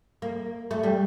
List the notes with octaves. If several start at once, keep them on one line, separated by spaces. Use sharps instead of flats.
A#3
A3
G3